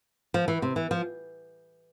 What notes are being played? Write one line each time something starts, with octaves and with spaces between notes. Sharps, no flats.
F3
E3
C3
E3
F3